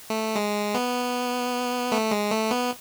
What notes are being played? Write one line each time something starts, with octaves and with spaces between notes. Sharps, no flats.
A3
G#3
B3
A3
G#3
A3
B3